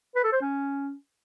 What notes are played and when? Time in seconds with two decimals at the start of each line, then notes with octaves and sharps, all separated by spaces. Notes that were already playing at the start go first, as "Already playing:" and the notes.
0.16 B4
0.24 A4
0.33 C5
0.41 C#4